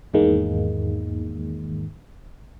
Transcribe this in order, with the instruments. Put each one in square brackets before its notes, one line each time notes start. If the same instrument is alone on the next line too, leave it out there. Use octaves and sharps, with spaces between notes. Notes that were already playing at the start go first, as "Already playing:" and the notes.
[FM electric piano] E2 G#2 D#3 G#3 A#3